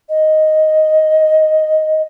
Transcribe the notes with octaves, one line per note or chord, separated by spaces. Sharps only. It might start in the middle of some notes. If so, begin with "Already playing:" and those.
D#5